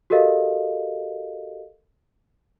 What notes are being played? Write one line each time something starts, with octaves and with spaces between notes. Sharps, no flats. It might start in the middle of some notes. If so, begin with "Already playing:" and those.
F#4 G4 A4 A#4 D#5 F5